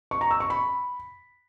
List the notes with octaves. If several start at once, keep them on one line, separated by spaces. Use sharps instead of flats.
C#6
A#5
E6
C#6
B5